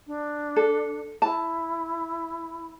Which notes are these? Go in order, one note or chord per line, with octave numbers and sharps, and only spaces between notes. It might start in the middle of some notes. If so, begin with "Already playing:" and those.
D4
A4
E4 A5